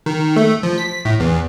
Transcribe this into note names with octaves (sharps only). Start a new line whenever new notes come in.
D#3
A3
F3
B6
A2
E2